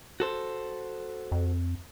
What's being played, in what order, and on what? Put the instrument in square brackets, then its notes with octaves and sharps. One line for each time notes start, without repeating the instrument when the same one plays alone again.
[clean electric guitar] F#4 A4 C5
[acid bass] F2